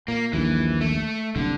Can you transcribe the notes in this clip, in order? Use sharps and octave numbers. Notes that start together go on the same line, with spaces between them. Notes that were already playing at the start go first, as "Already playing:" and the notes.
A#2 A#3
D#1 A#1 D#2 E3
A3
F#1 C2 D3